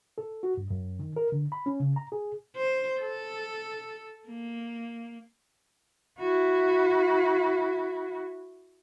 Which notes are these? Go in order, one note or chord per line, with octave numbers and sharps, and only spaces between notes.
A4
F#4
G2
F#2
D#3
A#4
D3
B5
C#4
C#3
A#5
G#4
C5
A4
A#3
E4 F#4